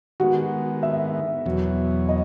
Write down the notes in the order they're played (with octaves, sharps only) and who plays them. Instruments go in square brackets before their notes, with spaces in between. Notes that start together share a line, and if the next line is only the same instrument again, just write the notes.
[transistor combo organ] D#3 G#3 B3 [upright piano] F#4
[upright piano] E5
[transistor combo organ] E2 B2 F#3
[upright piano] D#5